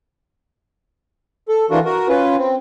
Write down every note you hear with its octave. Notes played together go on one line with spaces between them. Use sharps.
A4
E3 D4 F4 F#4 A#4
F#4 A#4
C#4 F4 B4
C4